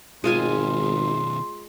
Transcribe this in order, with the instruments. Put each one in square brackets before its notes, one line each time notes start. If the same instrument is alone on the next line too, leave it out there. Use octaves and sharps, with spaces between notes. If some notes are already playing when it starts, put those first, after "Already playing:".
[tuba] G#1 [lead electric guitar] B2 D#3 [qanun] G#3 F4 G#5 [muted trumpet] C6